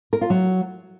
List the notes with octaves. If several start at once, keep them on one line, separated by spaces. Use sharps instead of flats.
A#4
F4
F#3